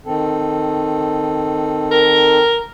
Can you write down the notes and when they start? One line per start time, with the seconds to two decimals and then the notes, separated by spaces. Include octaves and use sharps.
0.06 D#3 C4 A4
1.91 A#4